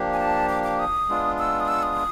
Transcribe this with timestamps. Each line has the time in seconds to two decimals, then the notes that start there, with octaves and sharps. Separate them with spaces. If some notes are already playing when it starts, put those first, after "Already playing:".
Already playing: F3 A#3 D4 G4
0.13 G#5
0.19 A5
0.49 D6
0.64 D6
0.79 D#6
1.09 G#3 B3 D4 F4
1.39 E6
1.60 D#6
1.68 E6
1.83 D#6